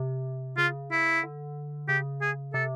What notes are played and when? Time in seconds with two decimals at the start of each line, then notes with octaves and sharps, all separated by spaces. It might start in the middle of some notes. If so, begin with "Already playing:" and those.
Already playing: C3
0.57 C#3 F4
0.91 E4
1.23 D3
1.88 C#3 G4
2.21 G#4
2.54 C3 A4